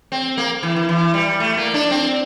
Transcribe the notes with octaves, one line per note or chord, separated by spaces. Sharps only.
C4
A#3
E3
E3
E3
G3
A3
A#3
D4
C4